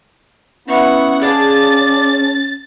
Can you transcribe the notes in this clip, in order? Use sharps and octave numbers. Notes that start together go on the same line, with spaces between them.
B3 C#4 E4 F#5 C#6
A#3 D4 G#4 D5 A6